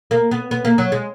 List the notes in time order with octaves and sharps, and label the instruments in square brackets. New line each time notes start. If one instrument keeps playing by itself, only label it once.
[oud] A#3
B3
B3
A#3
F#3
G#3